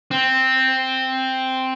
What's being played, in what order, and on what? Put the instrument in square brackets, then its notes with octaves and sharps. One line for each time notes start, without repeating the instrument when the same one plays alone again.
[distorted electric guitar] C4